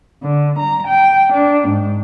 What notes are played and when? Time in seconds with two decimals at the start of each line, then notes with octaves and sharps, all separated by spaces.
0.23 D3
0.59 A#5
0.88 G5
1.33 D4
1.68 G#2